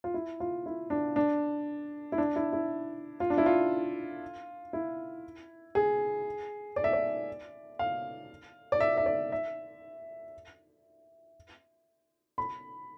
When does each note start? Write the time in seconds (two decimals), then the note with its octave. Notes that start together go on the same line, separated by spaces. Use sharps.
0.04 F4
0.14 E4
0.40 F4
0.66 E4
0.90 D4
1.16 D4
2.12 E4
2.18 D4
2.36 E4
2.53 E4
3.20 F4
3.30 D4
3.38 E4
3.46 F4
4.73 E4
5.75 G#4
6.76 D5
6.84 E5
6.93 D5
7.79 F5
8.72 D5
8.80 E5
8.97 E5
9.06 D5
9.32 E5
12.38 B5